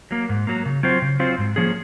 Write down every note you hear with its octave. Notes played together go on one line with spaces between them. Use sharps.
F#3 A#3
G#2
F#3 A#3
C#3
F#3 C4 F4 C5
C#3
F#3 C4 F4 C5
G#2
F3 A#3 C#4 G#4